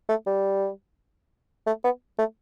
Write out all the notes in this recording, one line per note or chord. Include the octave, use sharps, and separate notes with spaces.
A3
G3
A3
B3
A3